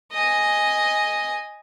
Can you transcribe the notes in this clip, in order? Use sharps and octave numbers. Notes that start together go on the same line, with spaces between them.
D#5 G#5